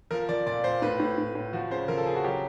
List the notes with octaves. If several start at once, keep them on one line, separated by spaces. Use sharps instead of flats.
F3 A#4
F3 D5
A#2 D5
A#2 C5
A2 B4
A2
A2
A2
F3 F#4
C#3 C5
F3 A#4
A4
C#3 G#4
F#4
F#3 G4